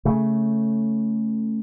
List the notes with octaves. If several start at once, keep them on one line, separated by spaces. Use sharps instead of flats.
C#3 A3